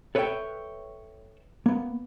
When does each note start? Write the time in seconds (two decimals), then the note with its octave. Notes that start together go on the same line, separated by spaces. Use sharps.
0.15 A4 B4 C#5 D5 E5 G5
1.66 A#3 B3